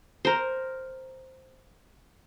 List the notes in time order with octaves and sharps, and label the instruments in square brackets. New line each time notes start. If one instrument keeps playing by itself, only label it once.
[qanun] A#4 C5